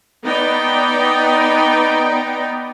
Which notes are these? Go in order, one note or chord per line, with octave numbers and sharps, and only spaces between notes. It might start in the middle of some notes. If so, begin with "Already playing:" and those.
B3 D#4 D5 G5